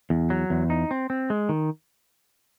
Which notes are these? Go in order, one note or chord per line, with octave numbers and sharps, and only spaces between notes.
E2
F#3
E2
D#4
C4
C4
G#3
D#3